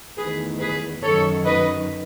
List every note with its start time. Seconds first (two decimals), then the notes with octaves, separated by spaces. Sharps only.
0.17 E2 D#3 A3 G#4 B4
0.59 G#4 B4
1.02 F#2 D#3 F#3 A4 C#5
1.45 B4 D#5